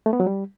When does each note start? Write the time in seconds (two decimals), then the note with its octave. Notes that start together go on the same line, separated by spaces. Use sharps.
0.06 A3
0.13 B3
0.20 F#3
0.27 G3